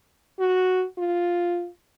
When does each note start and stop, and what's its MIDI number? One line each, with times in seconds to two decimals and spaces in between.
0.39 0.85 66
0.98 1.68 65